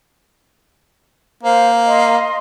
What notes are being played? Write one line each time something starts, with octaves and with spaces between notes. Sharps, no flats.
A#3 C5 F5
D#5 F5 C6